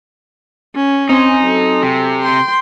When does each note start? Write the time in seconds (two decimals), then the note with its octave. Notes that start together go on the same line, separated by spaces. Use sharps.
0.75 C#4
1.09 C4 D#4 G#5 C6
1.41 F#3 A4
1.82 C3
2.22 G5 C6